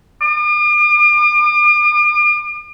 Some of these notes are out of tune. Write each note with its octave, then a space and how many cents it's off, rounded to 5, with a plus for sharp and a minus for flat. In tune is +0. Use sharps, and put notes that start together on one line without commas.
D6 +45